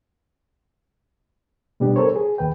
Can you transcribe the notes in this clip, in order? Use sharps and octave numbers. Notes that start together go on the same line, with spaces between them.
B2 G3 B3 D4 G4
A4 A#4 C5 C#5
G#4
D#2 B4 G5